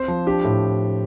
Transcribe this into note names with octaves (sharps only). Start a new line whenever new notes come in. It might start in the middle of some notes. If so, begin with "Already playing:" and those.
Already playing: C4 C5
F3
D4 G4
A2